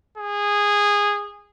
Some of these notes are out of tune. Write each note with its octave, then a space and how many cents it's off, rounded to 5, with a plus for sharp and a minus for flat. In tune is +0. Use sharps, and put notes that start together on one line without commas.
G#4 -15